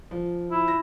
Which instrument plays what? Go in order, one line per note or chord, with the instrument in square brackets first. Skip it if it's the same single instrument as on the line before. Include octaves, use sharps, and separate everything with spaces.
[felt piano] F3
[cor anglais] E4
[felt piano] A#6